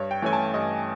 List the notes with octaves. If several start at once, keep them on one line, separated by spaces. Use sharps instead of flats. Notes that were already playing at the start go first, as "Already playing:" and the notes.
Already playing: G2 C#5
G5
E3 A3 C#4 G#5
A5
G2 D#5